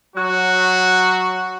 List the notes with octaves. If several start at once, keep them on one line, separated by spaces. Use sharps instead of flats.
F#3 F#4